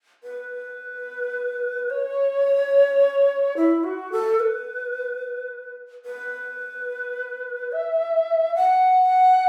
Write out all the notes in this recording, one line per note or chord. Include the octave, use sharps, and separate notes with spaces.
B4
C#5
E4
F#4
A4
B4
B4
E5
F#5